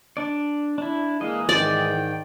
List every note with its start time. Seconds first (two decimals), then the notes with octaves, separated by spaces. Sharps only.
0.17 D4 D5
0.78 D4 E4
1.21 E3 G#3 A#3 G#4 D#5 F5
1.49 G#2 D#3 D5 G5